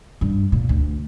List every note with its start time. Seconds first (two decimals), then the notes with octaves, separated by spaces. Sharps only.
0.21 G2
0.52 A#2
0.69 D2